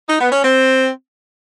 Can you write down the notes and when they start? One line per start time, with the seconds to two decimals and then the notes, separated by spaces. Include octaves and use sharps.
0.08 D#4
0.20 B3
0.31 C#4
0.43 C4